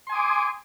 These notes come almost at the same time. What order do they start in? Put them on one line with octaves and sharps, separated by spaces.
C6 G#5 D#6 D6